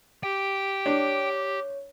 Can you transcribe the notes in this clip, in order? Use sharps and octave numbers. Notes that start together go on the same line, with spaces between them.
G4 G5
D4 C#5